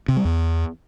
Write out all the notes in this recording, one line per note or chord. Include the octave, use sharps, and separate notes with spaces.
C3
G3
E2